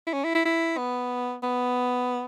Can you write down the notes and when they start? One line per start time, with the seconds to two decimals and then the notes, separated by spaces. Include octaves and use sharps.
0.07 E4
0.13 C#4
0.24 E4
0.35 E4
0.46 E4
0.78 B3
1.43 B3